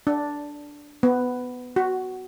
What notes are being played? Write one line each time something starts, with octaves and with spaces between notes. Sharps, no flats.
D4
B3
F#4